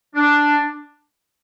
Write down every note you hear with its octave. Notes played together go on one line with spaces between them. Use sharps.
D4